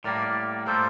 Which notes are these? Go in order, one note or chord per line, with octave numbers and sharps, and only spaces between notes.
A2 G3 A#3 A#4 D5
A2 G3 A#3 A4 C5